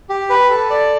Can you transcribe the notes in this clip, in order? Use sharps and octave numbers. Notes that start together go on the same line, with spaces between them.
G4
B4
A4
D5